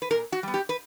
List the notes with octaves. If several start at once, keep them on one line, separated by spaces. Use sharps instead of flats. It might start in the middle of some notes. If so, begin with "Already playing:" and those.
B4
A#2 A#4
F#4
G3 B3
G4
B4